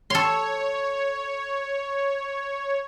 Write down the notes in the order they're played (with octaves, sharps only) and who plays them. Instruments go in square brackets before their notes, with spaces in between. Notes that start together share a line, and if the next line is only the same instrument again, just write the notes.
[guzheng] A4 C6 [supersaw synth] C#5